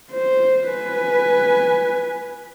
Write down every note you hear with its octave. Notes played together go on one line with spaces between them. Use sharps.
C5
B4 G#5